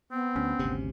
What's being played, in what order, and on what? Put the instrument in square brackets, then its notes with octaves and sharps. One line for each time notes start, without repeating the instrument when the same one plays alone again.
[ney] B3 [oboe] C4
[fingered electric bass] D2 [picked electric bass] C#4
[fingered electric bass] G#1 D2 C3